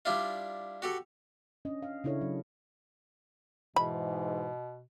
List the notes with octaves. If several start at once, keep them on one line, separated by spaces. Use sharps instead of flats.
G3 D4 E4 F4
F#4 G4 A4
C#4 D4 D#5
F5
C#3 D4 E4 A4 C#5
F#3
G#2 B2 E3 B5